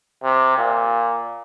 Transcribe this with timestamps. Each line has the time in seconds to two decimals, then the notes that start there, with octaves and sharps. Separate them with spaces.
0.23 C3
0.58 A#2